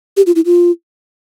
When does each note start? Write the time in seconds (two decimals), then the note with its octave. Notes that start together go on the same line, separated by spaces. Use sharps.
0.17 G4
0.27 F4
0.36 E4
0.46 F4